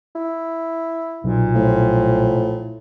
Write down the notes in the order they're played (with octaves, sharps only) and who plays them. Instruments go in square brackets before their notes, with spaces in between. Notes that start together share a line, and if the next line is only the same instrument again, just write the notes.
[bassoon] E4
[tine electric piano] B1 [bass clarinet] A#2
[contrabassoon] A2 [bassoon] F3